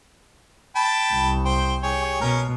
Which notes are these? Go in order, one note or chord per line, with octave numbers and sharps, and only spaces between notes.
G5 A5 B5
C2
C5 G5
G4 G#4 C#5
B2 C#4 A#4